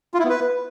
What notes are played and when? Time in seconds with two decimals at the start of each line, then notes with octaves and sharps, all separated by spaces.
0.14 F4
0.19 E4
0.24 B3
0.30 B4